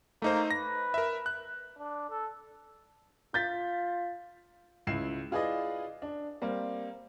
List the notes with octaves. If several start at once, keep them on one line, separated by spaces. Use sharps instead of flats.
A3 A#3 D#4 C5
B4 A#6
A#4 E5
F#6
D4
A4
F4 G6 A6 B6
C#2 E4 C7 E7
E4 F4 G#4 B4 D5 D#5
D4
G3 A#3 C4